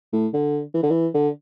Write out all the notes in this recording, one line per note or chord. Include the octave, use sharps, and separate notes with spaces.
A2
D3
E3
D3
E3
D3